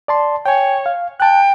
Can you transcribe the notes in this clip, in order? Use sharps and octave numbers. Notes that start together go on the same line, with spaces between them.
D5 A5 C6
C#5 G5 G#5
F5
G5 A5 F#6